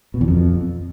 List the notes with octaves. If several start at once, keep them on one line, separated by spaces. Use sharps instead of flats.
B2
E2
F2